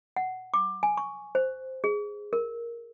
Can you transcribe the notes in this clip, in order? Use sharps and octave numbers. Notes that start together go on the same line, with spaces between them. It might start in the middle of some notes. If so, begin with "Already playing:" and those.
F#5
D6
G#5
C#6
C5
G#4
A#4